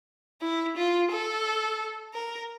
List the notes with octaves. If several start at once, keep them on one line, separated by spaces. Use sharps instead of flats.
E4
F4
A4
A#4